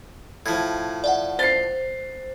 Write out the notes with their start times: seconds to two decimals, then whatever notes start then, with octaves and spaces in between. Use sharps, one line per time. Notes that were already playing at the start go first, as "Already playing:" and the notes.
0.46 A2 F3 G#6
1.04 D5 E5 F#5
1.39 C5 A6 C7